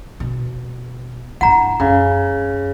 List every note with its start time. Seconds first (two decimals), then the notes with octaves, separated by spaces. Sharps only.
0.20 B2
1.41 G2 E4 F#5 A#5
1.80 F#2 C#3